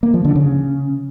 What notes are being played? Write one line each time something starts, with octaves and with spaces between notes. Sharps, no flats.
A#3
F3
D3
C#3